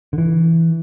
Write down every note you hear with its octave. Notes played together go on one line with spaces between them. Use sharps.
D3
E3